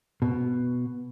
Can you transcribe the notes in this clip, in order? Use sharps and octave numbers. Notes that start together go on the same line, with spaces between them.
B2